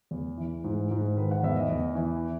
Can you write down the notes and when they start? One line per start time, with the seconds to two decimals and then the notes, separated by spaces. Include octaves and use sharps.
0.11 E2
0.38 E3
0.64 G#2
0.91 G#2
1.16 D#3 B4
1.31 F#5
1.43 E2 E5
1.56 D#5
1.69 E2
1.95 E3